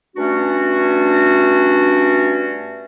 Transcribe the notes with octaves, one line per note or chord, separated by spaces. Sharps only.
G2 A3 C#4 D4 F#4